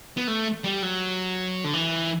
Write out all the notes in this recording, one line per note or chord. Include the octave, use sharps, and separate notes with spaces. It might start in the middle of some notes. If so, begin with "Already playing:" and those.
B3
A3
G3
F#3
D3
E3